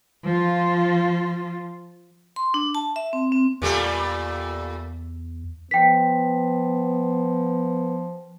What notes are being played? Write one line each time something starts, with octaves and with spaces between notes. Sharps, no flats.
F3 F4
C6
D4
A5
E5
C4
C4
E2 A#2 G3 A3
F3 B3 G5 B6